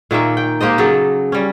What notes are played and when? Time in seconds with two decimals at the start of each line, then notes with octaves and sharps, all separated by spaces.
0.11 A#2 D#3 A#3 E5
0.37 G5
0.61 A#3 G4 C5 D#5
0.78 C#3 F#3 A4
1.32 G3 C#4